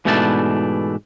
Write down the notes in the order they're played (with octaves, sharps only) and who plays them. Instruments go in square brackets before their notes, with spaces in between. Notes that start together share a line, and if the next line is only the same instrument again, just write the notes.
[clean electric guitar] G#2 B2 E3 A3 D4 A5